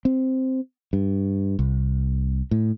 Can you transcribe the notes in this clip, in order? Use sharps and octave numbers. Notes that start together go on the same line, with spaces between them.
C4
G2
C2
A2